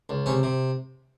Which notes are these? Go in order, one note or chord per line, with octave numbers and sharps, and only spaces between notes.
C#2
C3 C#4
C3